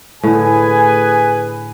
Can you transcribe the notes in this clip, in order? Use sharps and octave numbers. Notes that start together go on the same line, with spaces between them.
A2 D3 G#4 B4 G#5